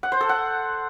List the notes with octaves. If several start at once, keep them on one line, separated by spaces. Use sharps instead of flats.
F#5
C5
A4
F#5